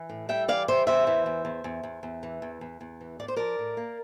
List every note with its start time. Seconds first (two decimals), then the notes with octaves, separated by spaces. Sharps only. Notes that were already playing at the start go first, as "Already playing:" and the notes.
Already playing: E3
0.09 A2
0.29 G3 E5 G5
0.48 E3 D5 F5
0.68 G3 C5 E5
0.87 E2 C5 E5
1.07 E3
1.26 E2
1.45 E2
1.64 E2
1.83 E2
2.03 E2
2.23 E3
2.42 E2
2.61 E2
2.81 E2
3.01 E3
3.20 A2 D5
3.28 C5
3.36 F3 A#4 D5
3.59 A2
3.77 A#3